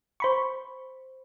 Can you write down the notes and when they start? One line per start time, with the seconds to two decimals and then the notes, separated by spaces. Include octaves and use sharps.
0.20 C5 B5 C#6